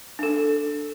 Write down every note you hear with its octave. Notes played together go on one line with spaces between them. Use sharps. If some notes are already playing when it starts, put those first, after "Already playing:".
D4 A4